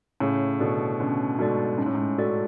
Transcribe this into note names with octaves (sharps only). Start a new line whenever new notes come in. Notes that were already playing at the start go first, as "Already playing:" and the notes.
A2 C#3 C#4
B2 D3 F#4 A4 D5
B2 D3 C#4
G#2 B2 F#4 A4 D5
G#2 C#4
A2
G#2
F#4 A4 D5